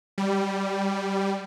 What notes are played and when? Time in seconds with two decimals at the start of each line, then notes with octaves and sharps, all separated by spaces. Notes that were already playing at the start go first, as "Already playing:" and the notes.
0.18 G3